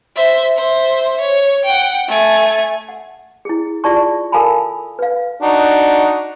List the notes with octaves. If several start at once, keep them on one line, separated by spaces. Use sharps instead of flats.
C5 E5
C5 E5
C#5
F#5 G5
A3 G#5
F#5
E4 G#4
F4 G#4 D5 A5 C#6
A4 A#4 F5 G#5 A5 B5
B4 F5
D4 D#4 F#4